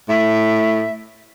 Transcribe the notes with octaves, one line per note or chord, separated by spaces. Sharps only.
A2 E5